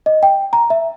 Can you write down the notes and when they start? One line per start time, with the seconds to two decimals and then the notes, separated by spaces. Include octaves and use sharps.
0.06 D#5
0.23 G5
0.53 A#5
0.70 E5